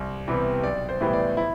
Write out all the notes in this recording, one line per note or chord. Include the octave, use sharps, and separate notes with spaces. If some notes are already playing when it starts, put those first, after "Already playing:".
Already playing: C2
C3 E3 G3 B3
B1 D5
C5
A2 E3 G3 B3
D5
E4